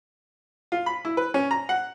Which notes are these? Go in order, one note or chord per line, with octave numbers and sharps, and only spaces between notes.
F4
B5
E4
B4
C#4
A#5
F#5